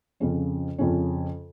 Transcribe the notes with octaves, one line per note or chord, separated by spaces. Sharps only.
F2 C#3 F3 C#4
F2 C#3 F3 C#4